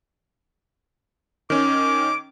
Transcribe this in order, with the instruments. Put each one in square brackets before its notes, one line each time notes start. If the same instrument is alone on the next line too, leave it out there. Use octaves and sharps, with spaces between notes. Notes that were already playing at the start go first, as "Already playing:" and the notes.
[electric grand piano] D#3 C#4 [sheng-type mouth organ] D6